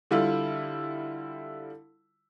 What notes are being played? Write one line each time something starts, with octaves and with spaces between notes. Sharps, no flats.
D3 G3 E4 F4